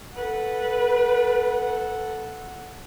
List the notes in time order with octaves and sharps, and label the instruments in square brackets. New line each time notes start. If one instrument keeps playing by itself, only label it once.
[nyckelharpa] A4 F#5 [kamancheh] B4